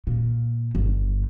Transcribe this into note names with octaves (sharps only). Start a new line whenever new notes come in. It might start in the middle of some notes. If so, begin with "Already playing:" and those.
A#2
G1